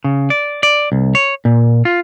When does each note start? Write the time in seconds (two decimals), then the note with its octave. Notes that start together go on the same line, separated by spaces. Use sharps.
0.04 C#3
0.30 D5
0.63 D5
0.92 C2
1.15 C#5
1.45 A#2
1.85 F4